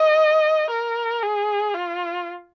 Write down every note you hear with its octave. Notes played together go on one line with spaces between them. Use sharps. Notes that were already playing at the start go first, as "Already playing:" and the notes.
Already playing: D#5
A#4
G#4
F4